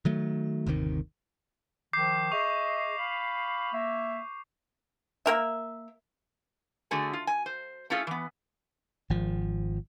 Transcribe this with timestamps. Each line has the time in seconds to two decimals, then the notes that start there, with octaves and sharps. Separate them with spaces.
0.05 D#3 F#3 A3
0.66 G1 D#2 C3 D#3
1.93 D#3 F3 D6 G6 C7
2.32 G#4 D#5 E5 C#6 D6 F7
2.98 F5 B5
3.73 A#3 E5
5.26 A#3 A#4 E5
6.91 D3 A3 F#4 G#4 G#5
7.13 F4
7.27 G#5
7.46 C5
7.90 A3 C#4 E4 F4 G#4 A4
8.07 E3 B3
9.10 G#1 F3